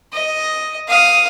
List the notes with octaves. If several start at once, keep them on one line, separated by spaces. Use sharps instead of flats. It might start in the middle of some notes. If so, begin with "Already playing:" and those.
D#5
F5 D#6